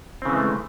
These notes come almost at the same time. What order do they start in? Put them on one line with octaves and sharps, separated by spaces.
C4 C#3 E3 G#3 A3